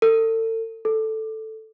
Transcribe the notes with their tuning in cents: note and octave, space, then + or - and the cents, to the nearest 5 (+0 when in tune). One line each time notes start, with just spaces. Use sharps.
A4 +35
A4 +0